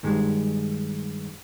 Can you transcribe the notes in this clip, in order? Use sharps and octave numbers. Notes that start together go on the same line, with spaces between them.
G2 D#3 G#3